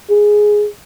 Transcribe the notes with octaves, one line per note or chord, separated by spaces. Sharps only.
G#4